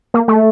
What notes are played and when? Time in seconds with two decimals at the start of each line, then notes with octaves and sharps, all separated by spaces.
0.14 A#3
0.28 A3